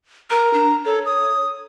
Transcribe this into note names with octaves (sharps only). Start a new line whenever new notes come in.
A#4 A#5
D4
A4 C#5
D#6